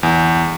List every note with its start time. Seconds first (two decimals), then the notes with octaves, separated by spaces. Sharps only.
0.03 E2